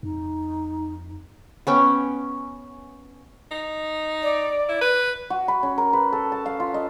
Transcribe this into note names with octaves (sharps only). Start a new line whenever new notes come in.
F2 D#4
B3 C#4 G5
D#4
D5
E4
B4
F#4
B5
C#4
A#4
B4
A4
A5
F5
F4
D#5